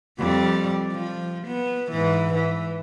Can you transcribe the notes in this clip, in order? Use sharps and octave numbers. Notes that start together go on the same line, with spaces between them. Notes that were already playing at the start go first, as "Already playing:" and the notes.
F2 G3 D5
F3
B3
G#2 E3
E3